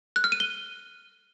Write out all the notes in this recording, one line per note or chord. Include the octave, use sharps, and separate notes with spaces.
F#6
F6
D#7
G7